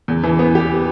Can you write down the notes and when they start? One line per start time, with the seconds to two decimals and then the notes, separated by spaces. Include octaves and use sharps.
0.08 E2
0.24 E3
0.39 B3
0.55 G4